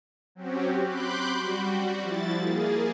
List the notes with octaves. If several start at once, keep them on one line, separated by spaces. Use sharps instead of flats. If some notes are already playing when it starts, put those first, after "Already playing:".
F#3 C4 C#4 F#4 G4
B5 C6 D6 F#6 G6
G3 F#4
F3 E4 A6
A#3 G#4